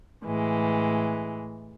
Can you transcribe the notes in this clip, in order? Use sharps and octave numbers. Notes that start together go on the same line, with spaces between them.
A2 E3 G#3